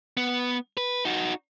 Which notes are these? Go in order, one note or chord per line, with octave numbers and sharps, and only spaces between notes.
B3
B4
D#4 F#4